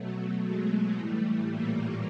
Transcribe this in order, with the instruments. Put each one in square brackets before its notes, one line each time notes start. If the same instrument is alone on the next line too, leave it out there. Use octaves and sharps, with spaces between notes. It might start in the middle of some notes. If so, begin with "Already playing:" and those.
Already playing: [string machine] B2 F#3 A3
G#3
A2 E3 G3 A3
A#2 A#3